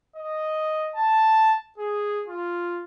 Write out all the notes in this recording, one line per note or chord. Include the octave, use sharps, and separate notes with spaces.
D#5
A5
G#4
F4